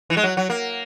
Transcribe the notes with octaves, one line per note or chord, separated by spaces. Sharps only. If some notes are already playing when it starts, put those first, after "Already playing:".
E3
G#3
F#3
F#3
A#3